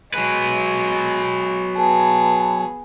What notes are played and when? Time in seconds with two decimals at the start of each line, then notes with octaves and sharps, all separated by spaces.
0.14 F#3 G#3 B4
1.76 B3 G#4 A5